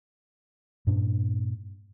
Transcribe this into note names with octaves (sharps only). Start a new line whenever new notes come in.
G2 A#2 D4